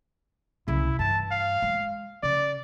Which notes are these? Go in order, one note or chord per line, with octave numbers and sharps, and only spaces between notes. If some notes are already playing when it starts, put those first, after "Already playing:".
C2 C#3 E4
G2 E3 A5
F5
G#3
C#3 D5